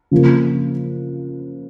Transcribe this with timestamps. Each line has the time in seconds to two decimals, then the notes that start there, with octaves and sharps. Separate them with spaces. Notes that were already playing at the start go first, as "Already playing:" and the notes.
0.11 C#3 F3 A#3